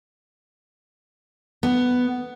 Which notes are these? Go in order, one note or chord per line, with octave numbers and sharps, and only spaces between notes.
B3